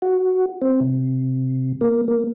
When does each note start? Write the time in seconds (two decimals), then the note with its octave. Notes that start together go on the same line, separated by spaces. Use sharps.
0.02 F#4
0.62 C4
0.81 C3
1.81 A#3
2.08 A#3